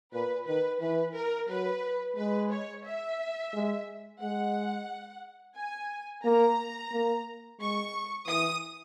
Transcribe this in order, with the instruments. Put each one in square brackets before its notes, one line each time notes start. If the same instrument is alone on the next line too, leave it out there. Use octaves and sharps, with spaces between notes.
[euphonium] A#2 [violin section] B4
[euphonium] D#3 [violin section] B4
[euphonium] E3 [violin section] B4
[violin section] A#4
[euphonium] F#3 [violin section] B4
[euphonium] G#3 [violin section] B4
[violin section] C#5
E5
[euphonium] G#3
[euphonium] G#3 [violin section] F#5
[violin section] G#5
[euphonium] A#3 [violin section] A#5
[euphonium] A#3
[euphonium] G#3 [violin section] C#6
[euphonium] E3 [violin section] D#6